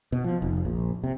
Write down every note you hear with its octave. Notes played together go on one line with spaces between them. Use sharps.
B2
F3
F1
A#1
C3